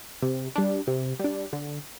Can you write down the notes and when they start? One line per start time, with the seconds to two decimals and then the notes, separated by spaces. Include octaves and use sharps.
0.22 C3
0.56 G3 D4
0.87 C3
1.20 G3 D4
1.53 D3